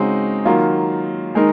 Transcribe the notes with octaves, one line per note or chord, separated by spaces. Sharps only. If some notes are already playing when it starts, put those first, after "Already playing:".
Already playing: C#3 G#3 C4 D#4 F#4
D#3 F#3 A#3 F4
D#3 G#3 D#4 A#4